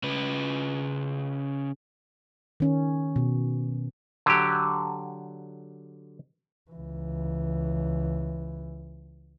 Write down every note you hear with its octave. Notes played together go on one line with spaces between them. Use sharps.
C#3 B4
D#3 C#4
B2
D3 F#3 G4
C#2 E3